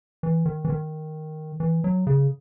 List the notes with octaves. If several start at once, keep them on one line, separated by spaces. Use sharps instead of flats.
E3
D#3
E3
D#3
E3
F#3
C#3